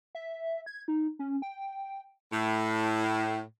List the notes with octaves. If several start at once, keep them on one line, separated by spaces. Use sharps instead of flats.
E5
G#6
D#4
C#4
G5
A2